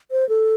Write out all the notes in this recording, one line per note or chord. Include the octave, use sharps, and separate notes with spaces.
C5
A4